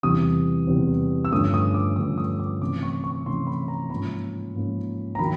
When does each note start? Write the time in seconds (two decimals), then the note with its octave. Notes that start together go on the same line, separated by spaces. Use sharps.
0.03 E2 C3 E3 G3 D#6
0.67 E2 C3 E3 G3
1.25 E6
1.32 G2 D3 F3 A3 C#4 D#6
1.54 D#6
1.74 D6
1.96 G2 D3 F3 A3 C#4 D#6
2.18 D#6
2.40 D6
2.61 C3 E3 A3 C#4 D6
2.83 C#6
3.04 C#6
3.26 C3 E3 A3 C#4 C6
3.47 B5
3.68 A#5
3.90 G#2 F3 A#3 C#4 B5
4.55 G#2 F3 A#3 C#4
5.15 A#5
5.19 D#3 F#3 B5